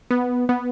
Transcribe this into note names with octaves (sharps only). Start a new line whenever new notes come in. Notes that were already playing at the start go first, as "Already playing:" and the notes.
B3
B3